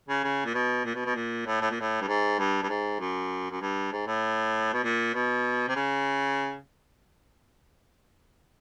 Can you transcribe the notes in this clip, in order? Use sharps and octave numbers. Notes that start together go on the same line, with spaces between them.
C#3
C#3
A#2
B2
A#2
B2
B2
A#2
A2
A2
A#2
A2
G2
G#2
G2
G2
G#2
F#2
F#2
G2
G#2
A2
B2
A#2
B2
C3
C#3